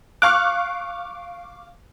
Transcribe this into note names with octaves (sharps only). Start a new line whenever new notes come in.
F5 C#6 D6 F6 F#6